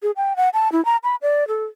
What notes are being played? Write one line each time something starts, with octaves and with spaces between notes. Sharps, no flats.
G#4
G5
F#5
A5
E4
A#5
B5
D5
A4